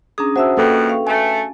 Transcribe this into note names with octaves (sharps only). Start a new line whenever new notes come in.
C#4 D4 G#4 A#5 D#6
F#4 C5 E5 F#5 A5 E6
F2 B2 A#3 A4 B4 G5
F5 C#6
A3 G#5 A5